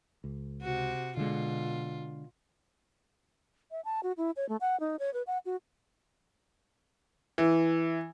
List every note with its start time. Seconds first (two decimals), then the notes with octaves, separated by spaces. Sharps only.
0.24 C#2
0.62 C3 F#4
1.17 B2 D3 G#3 F4
3.71 E5
3.85 A5
4.03 F#4
4.17 E4
4.37 C#5
4.49 A3
4.61 F#5
4.80 D#4
4.99 C#5
5.14 B4
5.27 F#5
5.46 F#4
7.38 E3